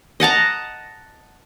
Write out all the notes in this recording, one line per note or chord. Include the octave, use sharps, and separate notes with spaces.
D#5 F#5 A5 A#5